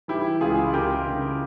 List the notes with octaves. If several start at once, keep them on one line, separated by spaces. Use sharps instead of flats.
E3 E4 G4
C#2 F4 G#4
C#2 G4 A#4
C#3